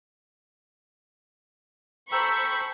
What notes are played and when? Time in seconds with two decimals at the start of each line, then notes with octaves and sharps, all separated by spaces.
2.12 A4 C5 G5 A#5 B5 C#6 E6